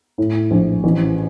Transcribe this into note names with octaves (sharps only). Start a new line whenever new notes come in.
A2
A#1
A1